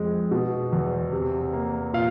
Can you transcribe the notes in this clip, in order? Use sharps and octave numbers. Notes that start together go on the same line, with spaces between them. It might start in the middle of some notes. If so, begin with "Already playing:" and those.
Already playing: F2 G#3
B2
E2
C3
A#3
A#2 F5